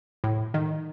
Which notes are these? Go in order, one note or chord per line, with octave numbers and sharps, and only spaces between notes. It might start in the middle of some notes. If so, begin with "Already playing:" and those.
A2
D#3